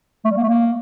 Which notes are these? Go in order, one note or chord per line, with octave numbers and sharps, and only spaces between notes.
A3
G3
A#3
A3
A#3